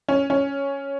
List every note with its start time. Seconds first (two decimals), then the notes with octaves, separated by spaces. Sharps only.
0.08 C#4
0.30 C#4